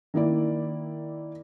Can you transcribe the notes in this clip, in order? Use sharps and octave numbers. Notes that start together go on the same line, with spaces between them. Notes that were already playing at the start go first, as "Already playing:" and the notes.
D#3 A#3 E4 D5